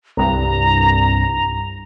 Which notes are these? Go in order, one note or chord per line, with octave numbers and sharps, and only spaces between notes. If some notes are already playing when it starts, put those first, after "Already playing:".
C2 G2 A#5